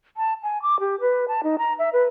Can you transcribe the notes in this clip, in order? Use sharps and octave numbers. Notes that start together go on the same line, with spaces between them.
A5
G#5
D6
G4
B4
A5
D#4
A#5
E5
B4